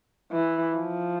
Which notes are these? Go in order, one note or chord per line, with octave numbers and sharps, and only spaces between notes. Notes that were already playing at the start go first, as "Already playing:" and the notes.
E3
F3